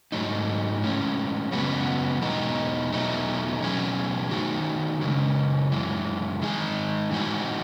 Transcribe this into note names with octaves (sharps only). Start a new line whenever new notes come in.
G#2 F#3 A3 D#4
A2 G#3 C#4
F#2 C#3 G#3 B3 F#4
E2 B2 G#3 D#4
E2 B2 F#3 A3 D#4
B2 F#3 C#4 G#4
D#3 A3 D#4 F#4
F#2 C#3 G#3
F#2 E3 G#3
D#3 G#3 D#4 G#4
A2 E3 G#3 D#4 F#4